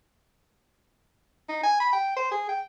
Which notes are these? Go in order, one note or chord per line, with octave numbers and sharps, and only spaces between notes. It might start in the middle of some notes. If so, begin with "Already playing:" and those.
D#4
G#5
B5
G5
C5
G#4
G5